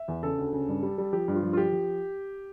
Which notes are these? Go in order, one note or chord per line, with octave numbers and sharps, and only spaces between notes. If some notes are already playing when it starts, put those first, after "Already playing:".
Already playing: E5
E2
C#3 A4
D2
C#3
G2
G3
G3
F3 G4
G2
F4
F3
F4
F3 G4
F3